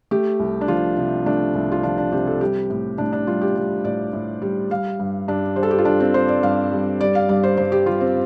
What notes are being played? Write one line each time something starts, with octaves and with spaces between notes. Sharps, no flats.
A3 G4
C2
D4
F3 F4
C3
A3 D4
C2
F4
F3 D4
D4
C3 G4
A4
G3 G4
A2
A2 D4
D4
G3 F4
G4
G3
A2 D5
A2
G3
G3 F5
G2
G2 D4
G3 C5
A4
G4
F4
G3 D4
C4
G2 C5
D5
G2 F5
G3
G3 D5
F5
G2 D5
C5
G2 C5
G4
G3 F4
C4